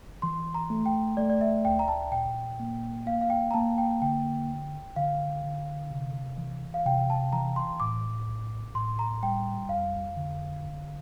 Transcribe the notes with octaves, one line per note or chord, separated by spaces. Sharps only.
E3 C6
A#5
A3
G5
A3 D5
D5
E5
D2 G5
A#5
A5
A#2 G5
A#3
A#3 F5
F5
G5
A#5
A#3 A5
G5
D3 G5
G1
D3 F5
D3
C3
E3
F5
C3 G5
A5
E3 A#5
C6
A2 D6
A#1
A2 C6
A#5
G3 G5
F2 F5
D3
G1